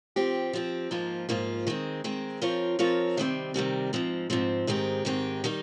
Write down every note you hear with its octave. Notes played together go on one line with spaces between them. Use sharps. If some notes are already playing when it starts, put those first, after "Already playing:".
F3 C4 G4
F3 C4 G4
G#2 F3 A#3 F4
G#2 F3 A#3 F4
D#3 G#3 C4
D#3 G#3 C4
F3 C4 F4 A#4 C#5
F3 C4 F4 A#4 C#5
C3 D#3 G3 C4
C3 D#3 G3 C4
G#2 F3 C4
G#2 F3 C4
G#2 D#3 G#3 C4 G4
G#2 D#3 G#3 C4 G4
D#3 G3 C4 D#4